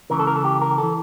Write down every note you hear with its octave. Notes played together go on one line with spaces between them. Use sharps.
C#2 C#3 E3 A#4
A4
A#4
A4
G4
A#4
E3 A4